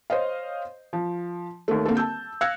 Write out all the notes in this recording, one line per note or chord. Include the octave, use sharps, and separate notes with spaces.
C5 C#5 D#5 F5
F3
D#2 A3
D3 A#3 C4 A4
A5 E6 G6
F5 E6 F#6 G#6 A#6 C#7